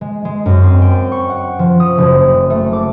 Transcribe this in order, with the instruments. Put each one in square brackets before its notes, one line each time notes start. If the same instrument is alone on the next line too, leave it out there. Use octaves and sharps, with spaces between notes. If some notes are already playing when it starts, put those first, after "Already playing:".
[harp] G#3
G#3
F#2
C4
G5
C#6
F#5
F3
D#6
F#1
A3
D6